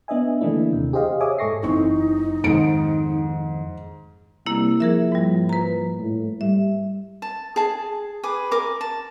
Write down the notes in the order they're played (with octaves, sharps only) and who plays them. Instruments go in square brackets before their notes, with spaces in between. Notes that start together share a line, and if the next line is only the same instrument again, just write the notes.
[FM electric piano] B3 D4 D#5 E5 G#5
D3 E3 A3 A#3 D4 E4
D#2 C3
G4 G#4 C5 D#5 F5
C#5 E5 G#5 D6 D#6
G#2 A4 C#6 A#6 C7
[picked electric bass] F#1 [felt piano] E3 C4 C#6 [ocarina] D#4
[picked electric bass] F2 D#3 [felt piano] G#2 C#7 D7
[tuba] C2 [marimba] A#3 E4
[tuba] F3 [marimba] G#4 A#4 E5
[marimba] G#2 G3
B4 A#5
[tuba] A2
[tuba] G3 [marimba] E5
[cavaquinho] A5
G#4 A5
G#4 B4 D6
A#4 D6
A5